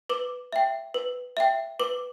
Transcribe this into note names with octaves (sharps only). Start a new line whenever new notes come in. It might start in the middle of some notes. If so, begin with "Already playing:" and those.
B4 D6
E5 G5
B4
E5 G5
B4 D6